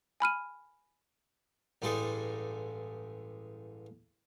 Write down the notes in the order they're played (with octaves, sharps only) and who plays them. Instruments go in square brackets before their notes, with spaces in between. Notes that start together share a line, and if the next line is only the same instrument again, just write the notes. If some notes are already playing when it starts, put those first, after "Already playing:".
[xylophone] G#5 B5 F6 D#7
[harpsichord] A1 G2 G#3 G#4 A4 D5